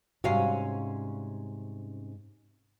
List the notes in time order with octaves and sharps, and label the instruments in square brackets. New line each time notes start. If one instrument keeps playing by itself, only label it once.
[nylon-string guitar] G#2 G3 F#4 [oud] C3 C#4 F5